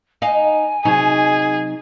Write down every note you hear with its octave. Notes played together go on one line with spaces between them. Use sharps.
D#4 F5 G#5
C3 F#3 D#4 G#4